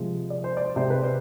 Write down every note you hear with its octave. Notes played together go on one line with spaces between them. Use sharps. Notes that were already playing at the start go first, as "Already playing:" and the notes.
Already playing: C3 F3 G#3
D5
C5
D5
C3 G#3 C5
B4
C5